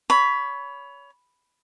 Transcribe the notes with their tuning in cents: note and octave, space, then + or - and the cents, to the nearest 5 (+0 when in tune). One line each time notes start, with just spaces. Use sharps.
C#5 +25 B5 +0